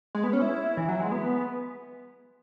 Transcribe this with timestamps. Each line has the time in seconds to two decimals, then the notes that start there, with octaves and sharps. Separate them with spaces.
0.15 G#3
0.24 B3
0.33 C#4
0.42 E4
0.77 E3
0.89 F#3
1.00 G#3
1.12 B3